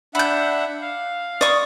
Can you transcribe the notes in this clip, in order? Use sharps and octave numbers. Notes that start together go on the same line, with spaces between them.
D4 E5 F#5 B5 G6
F5
D5 C#6 D#6